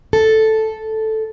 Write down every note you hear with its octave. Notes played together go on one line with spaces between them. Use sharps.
A4